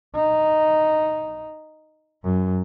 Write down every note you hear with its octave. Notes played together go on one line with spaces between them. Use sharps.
D#4
F#2